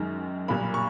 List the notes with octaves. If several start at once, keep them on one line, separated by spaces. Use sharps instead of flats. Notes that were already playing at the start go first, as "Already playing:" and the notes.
Already playing: F#2 D#3 G#3
B1 A#2 G3 A#3 B5
C#6